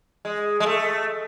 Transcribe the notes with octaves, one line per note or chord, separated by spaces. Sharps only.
G#3
G#3
A3